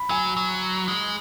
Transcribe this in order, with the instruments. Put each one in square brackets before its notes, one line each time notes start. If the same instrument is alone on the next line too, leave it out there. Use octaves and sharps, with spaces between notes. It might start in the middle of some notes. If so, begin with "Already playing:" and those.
Already playing: [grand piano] B5
[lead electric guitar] F#3 [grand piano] G#5
[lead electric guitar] F#3
G#3